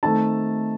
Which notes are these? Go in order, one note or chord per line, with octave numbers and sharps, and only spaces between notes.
D#3 A3 C4 D#4 A5